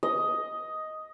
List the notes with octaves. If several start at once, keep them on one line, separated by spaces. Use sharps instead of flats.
D#5